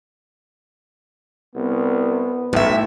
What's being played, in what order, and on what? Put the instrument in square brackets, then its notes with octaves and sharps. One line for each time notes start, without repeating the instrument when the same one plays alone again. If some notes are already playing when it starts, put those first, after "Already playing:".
[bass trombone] C2 [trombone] B3
[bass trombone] B1 [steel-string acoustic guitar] A2 E5